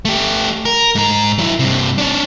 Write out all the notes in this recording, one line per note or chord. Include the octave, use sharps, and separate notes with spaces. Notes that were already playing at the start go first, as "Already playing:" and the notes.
A3 G4
A#4
G#2 A#5
F#3 E4
G2 C3
C#4 D4